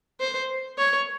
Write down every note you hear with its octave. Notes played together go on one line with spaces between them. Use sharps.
C5
C#5